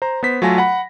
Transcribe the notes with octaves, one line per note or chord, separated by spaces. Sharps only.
C5 A#5
B3 C5 B6
F#3 A3 F4 A4 G#5 A#6
F#5 B5